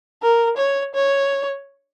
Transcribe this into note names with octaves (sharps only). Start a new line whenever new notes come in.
A#4
C#5
C#5